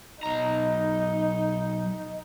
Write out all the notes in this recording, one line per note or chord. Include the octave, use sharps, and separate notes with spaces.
B1 D#4 A#5